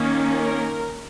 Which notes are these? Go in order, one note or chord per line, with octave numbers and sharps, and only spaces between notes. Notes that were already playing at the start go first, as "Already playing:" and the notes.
Already playing: D#3 A#3 C#4
A#4